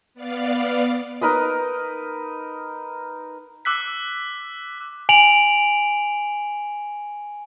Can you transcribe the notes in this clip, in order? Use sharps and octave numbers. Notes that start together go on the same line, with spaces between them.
B3 D5 F5
D#4 A#4 B4 D#5
D6 E6 F#6 B6
G#5 D7 F7 F#7